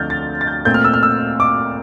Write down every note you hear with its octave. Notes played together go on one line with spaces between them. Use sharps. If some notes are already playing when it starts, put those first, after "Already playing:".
Already playing: D2 D3 F3 A3 C4 F6 G6 A6
A6
A6
G6
A#2 A3 C4 G6
F6
E6
F6
E6
D6